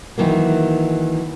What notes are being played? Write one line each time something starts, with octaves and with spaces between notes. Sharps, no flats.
D#3 E3 F#3 A#3